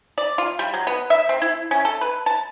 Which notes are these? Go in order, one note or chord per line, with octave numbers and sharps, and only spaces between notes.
D5
F4
G3
F#3
B3
E5
C4
E4
C#4
A4
B4
A5